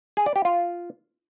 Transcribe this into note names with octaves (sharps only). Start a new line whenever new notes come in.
G#4
D5
G4
F4